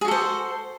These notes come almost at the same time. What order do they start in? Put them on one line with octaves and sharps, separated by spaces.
G#4 F#4 A4 C5